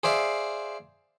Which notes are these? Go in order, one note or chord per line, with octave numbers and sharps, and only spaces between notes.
G#4 C5 D5 E5 F5